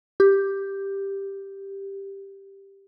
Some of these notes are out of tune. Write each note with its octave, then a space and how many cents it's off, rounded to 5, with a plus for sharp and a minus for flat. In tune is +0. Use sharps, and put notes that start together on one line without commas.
G4 +5